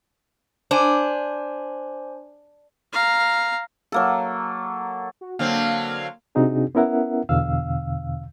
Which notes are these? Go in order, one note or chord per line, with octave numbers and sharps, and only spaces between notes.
D4 C5 G#5
F5 A#5
F#3 A#3 A4
F#4
D3 F#3 A#3 C4 F5
C3 C4 D4 D#4 F#4 G#4
B3 C#4 E4 A#4 E5 F#5
E2 B2 D3 F5 E6